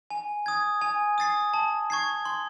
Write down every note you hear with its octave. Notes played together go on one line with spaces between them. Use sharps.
G#5
D#6 G#6
G#5
D#6 A6 C7
A5
C#6 G#6 C7
C6